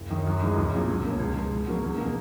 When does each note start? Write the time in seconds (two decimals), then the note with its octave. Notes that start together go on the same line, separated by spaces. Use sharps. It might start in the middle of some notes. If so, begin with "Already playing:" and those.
Already playing: F#1
0.10 F#2 D#3
0.26 F#2
0.41 E3 G#3 D#4
0.57 B1
0.72 A#2 F#3 C#4 G#4
0.88 C#2
1.04 B2 A#3 C#4
1.19 C#2
1.36 B2 G#3
1.51 G#2
1.67 F#3 A#3 C#4 F#4
1.83 E2
1.98 B2 A#3